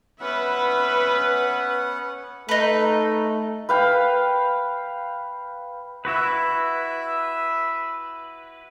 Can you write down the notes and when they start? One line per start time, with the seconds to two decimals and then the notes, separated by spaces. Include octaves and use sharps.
0.21 B3 C#4 B4 E5 F#5
2.49 A3 D#4 B4
3.69 B4 F5 G5
6.05 E4 F#4 B4 E5